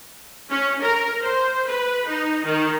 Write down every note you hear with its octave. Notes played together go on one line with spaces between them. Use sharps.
C#4
A#4
C5
B4
D#4
D#3